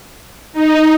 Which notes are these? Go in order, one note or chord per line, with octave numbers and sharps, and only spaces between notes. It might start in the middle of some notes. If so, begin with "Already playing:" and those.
D#4